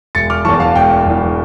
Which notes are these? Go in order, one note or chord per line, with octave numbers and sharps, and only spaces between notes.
E1 A6 C#7
D6 F6
E2 E3 A5 C#6
F5 A5
E1 G5
E2 E3